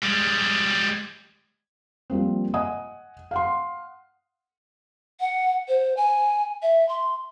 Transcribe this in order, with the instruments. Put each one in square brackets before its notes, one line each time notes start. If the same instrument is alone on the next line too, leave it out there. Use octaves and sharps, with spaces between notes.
[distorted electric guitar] G3 G#3
[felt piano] F3 G3 A#3 C4
D#5 F#5 G#5 D#6
F5 F#5 C6
[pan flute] F#5
C5
G#5
E5
C6